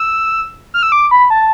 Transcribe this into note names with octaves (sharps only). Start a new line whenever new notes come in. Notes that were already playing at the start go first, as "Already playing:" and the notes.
Already playing: E6
F6
E6
D6
B5
A5